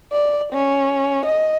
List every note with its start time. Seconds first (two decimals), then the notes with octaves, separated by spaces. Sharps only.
0.12 D5
0.53 C#4
1.26 D#5